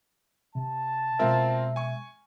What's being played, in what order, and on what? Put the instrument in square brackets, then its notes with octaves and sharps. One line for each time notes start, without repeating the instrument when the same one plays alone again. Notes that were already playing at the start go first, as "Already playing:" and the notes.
[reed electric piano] C3 [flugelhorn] A5
[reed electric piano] B2 G#3 E5 [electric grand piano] C4 F4 A#4
[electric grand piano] G#5 C#6